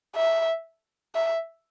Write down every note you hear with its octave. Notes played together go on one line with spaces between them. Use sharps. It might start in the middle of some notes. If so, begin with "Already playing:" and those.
E5
E5